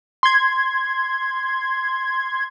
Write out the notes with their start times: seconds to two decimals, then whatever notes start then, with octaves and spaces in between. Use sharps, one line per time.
0.23 C6 G#6